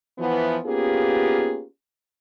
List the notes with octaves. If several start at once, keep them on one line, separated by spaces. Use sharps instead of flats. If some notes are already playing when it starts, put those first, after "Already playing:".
E3 F3 B3
A#3 B3 C#4 F4 G4 G#4